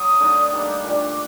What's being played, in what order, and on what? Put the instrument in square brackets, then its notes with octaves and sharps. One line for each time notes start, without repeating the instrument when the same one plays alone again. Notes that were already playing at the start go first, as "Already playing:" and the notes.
Already playing: [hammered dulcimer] F#3 [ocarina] D#6
[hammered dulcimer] D3 A3 D#4
D#3 G3 A#3 D4
[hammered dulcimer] A#2 A3 D4 G4 [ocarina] D6